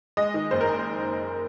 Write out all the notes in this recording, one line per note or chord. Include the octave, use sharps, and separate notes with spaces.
G#3 D#5
D#3
F#1 C5
A#4